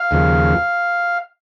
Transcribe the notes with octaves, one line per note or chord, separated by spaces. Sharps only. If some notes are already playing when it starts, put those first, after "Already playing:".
Already playing: F5
D#2 C#3 F3